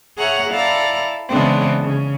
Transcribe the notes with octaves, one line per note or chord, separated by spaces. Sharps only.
G#4 C#5 E5 F#5 A#5
E4 A4 D5 F5 A#5
C#3 E3 G#3 B3 C4 D4
C#3